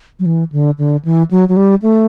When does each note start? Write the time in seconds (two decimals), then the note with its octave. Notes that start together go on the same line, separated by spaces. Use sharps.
0.19 F#3
0.26 E3
0.52 D3
0.78 D3
1.05 E3
1.31 F#3
1.49 F#3
1.57 G3
1.82 A3